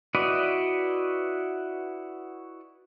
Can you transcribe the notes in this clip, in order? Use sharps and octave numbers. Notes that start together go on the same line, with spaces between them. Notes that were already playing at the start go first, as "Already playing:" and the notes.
E4 F#4 B4 D5 D#5